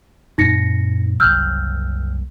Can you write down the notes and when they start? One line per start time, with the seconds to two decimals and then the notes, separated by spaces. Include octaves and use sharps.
0.38 F#2 A#2 C4 D#4 A#6 C#7
1.20 F#1 C2 F#3 E6 F6 G6